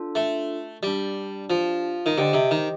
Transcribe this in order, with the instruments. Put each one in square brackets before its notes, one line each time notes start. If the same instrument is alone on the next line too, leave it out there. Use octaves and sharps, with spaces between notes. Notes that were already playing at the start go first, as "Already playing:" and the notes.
Already playing: [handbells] D4 F4 A4
[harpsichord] A3
[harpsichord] G3 [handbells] D4 G4 D5
[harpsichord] F3
D#3
[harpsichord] D3 [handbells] G4 C5 D#5 G5
[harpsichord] C3
D#3